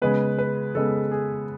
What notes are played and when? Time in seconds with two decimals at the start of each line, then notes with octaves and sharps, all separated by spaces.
0.02 C#3 G#3 B3 B4
0.38 B4
0.75 C#3 G#3 B3 A4
1.11 G#4